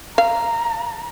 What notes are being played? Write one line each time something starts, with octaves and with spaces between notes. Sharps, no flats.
F5 A#5